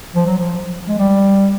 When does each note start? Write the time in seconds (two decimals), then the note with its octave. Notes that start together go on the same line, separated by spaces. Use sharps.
0.15 F3
0.26 F#3
0.38 F3
0.88 G#3
0.98 G3